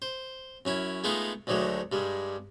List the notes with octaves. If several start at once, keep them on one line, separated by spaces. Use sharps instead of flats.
C5
F#2 C#4 E4
G#3 A3 B3 D#4 F4 G#4
D2 D3 D#3 F#3 G#3 A3
G2 G3 G#3